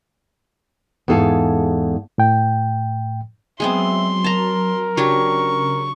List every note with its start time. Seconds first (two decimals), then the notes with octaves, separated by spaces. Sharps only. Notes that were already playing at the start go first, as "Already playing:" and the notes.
1.08 E2 G#2 A4 F5 G#5
2.18 A2 G5
3.60 F#3 G#3 B3 C4 E5 C6
4.24 A#4 A5 A#5
4.97 C#3 F#3 D4 G4 C#6